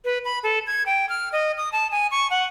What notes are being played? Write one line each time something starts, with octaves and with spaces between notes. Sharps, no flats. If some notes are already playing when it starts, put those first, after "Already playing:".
B4
B5
A4
G#6
G5
F6
D#5
D#6
A5
G#5
C#6
F#5